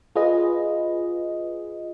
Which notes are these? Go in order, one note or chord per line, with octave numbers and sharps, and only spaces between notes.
F4 G#4 B4 D#5